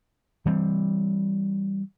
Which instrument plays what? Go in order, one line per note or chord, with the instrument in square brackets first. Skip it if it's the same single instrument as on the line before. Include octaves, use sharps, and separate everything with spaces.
[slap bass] E3 G3 C4